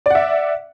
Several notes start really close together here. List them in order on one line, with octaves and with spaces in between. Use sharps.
D5 F#5 E5